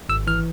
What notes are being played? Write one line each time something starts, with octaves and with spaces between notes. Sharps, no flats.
G#1 E6
E3 F6